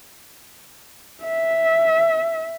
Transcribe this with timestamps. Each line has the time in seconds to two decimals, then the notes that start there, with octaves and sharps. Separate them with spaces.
1.24 E5